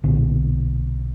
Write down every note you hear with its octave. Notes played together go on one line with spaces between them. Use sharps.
B1 A#2 D3 B3